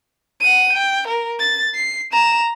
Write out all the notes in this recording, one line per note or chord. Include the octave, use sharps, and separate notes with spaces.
F#5 D#7
G5
A#4
A6
C7
A#5 E7